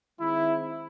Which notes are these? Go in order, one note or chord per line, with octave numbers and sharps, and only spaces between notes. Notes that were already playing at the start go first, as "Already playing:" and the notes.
D#3 G#3 C4 E4